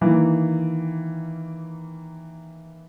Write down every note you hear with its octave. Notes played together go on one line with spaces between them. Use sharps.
D#3 E3 A#3